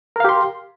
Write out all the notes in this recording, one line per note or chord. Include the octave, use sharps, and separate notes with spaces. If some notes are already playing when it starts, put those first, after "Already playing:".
G4 A#4 F5 C6